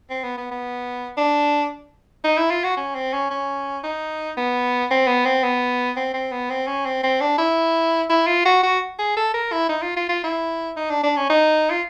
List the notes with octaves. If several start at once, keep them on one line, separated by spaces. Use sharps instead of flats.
C4
B3
B3
B3
D4
D#4
E4
F4
F#4
C#4
C4
C#4
C#4
D#4
B3
C4
B3
C4
B3
C4
C4
B3
C4
C#4
C4
C4
D4
E4
E4
F4
F#4
F#4
G#4
A4
A#4
E4
D#4
F4
F4
F4
E4
D#4
D4
D4
C#4
D#4
F4